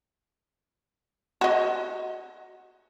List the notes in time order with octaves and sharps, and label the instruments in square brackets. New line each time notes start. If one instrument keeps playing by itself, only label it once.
[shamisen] F#4 D#5